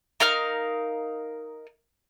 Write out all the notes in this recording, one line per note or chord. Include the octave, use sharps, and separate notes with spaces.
D#4 A#4 F5 F6